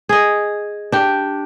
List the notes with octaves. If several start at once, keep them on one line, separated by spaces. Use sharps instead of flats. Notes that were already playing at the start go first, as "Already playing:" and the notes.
G#4 D#5
D4 G4